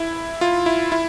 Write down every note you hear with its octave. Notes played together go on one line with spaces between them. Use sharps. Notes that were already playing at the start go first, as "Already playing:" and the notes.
Already playing: E4
F4
E4
E4